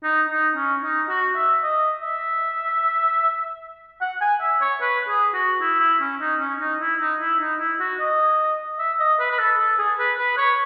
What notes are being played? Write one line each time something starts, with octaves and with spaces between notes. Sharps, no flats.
D#4
D#4
C#4
D#4
F#4
E5
D#5
E5
F#5
G#5
E5
C#5
B4
G#4
F#4
E4
E4
C#4
D#4
C#4
D#4
E4
D#4
E4
D#4
E4
F#4
D#5
E5
D#5
B4
B4
A4
A4
G#4
B4
B4
C#5